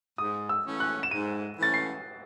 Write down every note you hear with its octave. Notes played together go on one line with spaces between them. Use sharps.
G#2 D#6
E6
E3 A3 C#4
F#6
E7
G#2 D#7
E3 A3 C#4 A6
C7